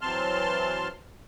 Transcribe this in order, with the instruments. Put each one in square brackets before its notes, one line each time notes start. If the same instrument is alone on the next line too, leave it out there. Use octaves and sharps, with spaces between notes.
[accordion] E3 F#3 C4 A5 C6 F6